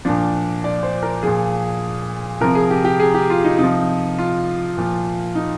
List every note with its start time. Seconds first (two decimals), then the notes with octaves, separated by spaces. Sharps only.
0.05 A#2 F3 D4
0.64 D5
0.83 C5
1.03 A#4
1.23 A#2 F3 G#4
2.41 C3 F3 A#4
2.55 G#4
2.70 G4
2.85 G4
3.00 G#4
3.14 G4
3.30 F4
3.44 D#4
3.58 C3 F3 D#4
4.18 F4
4.78 A#2 F3
5.35 D#4